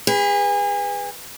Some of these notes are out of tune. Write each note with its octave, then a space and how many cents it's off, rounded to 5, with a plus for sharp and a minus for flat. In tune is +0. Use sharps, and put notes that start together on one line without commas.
G#4 -35 B4 +0